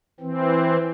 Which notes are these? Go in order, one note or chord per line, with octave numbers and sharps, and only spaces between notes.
E3 C4